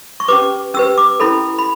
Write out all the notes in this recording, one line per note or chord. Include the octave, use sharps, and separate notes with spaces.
C#6
C#4 G4 B4 D6
C#4 G4 B4 E6
D6
C#4 E4 A4 B5
B5